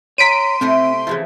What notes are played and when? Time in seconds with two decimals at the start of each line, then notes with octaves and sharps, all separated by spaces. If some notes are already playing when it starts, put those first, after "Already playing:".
0.18 C#5 A#5 C6 B6 D7 D#7
0.61 C3 A3 C4 E4
1.07 C#3 E3 F3 E4 G#4